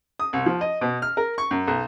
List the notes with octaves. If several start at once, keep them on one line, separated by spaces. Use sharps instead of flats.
D#6
C2
F3
D#5
B2
F6
A#4
C#6
F#2
B1